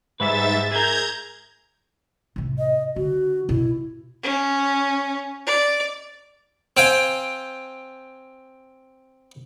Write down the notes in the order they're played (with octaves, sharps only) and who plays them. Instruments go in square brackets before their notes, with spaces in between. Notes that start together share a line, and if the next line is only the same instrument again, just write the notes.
[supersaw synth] G#2 E5 A6 [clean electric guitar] G3 G#3 B4
[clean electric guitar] G#4 A#4 [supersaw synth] A#5 G6 G#6
[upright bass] A2 C3
[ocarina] D#5
[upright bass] D3 [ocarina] F#4
[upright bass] B2 A#3 [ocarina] E4
[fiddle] C#4
D5
[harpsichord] C4 F5 G5 G#5